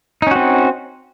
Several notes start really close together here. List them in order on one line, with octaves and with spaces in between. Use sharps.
D#4 C#4 F#4 C4